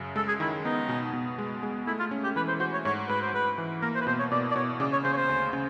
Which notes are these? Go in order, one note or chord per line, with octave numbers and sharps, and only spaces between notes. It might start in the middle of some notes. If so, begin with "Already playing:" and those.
Already playing: F#2 C#3
G#3 A4
G#4
D#3 E4
B3 D#4
B2
B2
G#3
G#3
A3 E4
F4
C#4
G4
E3 B4
C5
F#4 C5
C#5
G#2 C#5
G#2 B4
C5
G#2 B4
E3
A#3 A#4
C5
B4
B2 C5
C#5
B2 D5
D5
B2 C#5
C#3 D5
C#5
C#3 C5
C#5
C5
D2
C#3